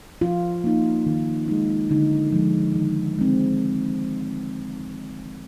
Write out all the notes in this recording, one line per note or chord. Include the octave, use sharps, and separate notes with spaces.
F3 F4
A#3 D#4
D#3
G#3 D#4
D3 D#4
F3 G#3
D#3
G#3 C4